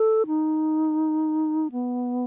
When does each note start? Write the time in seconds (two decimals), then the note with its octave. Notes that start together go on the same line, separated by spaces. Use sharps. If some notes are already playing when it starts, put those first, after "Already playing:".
Already playing: A4
0.27 D#4
1.72 B3